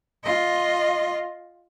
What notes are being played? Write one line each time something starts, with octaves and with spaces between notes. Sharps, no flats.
F4 D#5